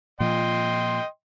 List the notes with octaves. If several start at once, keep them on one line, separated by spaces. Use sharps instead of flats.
A#2 F3 D#5 G5 C6